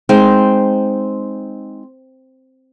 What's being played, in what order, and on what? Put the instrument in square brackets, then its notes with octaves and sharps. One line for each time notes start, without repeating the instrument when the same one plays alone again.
[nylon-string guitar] G#3 D#4 [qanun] C4